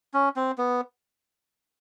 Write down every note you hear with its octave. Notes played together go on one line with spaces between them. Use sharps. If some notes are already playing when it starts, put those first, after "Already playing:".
C#4
C4
B3